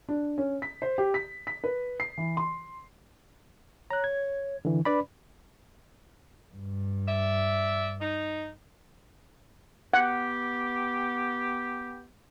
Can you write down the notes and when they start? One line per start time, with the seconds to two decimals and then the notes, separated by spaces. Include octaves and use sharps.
0.09 D4
0.38 C#4
0.62 B6
0.82 C5
0.98 G4
1.14 B6
1.47 B6
1.64 B4
2.00 C7
2.18 E3
2.37 C6
3.90 C#5 A#5 F#6
4.04 G#6
4.65 D3 E3
4.85 D4 B4 D5 B5
6.54 G2
7.08 D5 E5
8.01 D#4
9.94 B3 G4 F#5